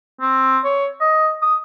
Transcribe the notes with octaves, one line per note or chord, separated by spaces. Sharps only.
C4
C#5
D#5
D#6